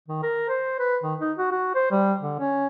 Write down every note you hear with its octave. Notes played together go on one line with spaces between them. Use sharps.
D#3
A#4
C5
B4
D#3
D#4
F#4
F#4
C5
G3
D3
C#4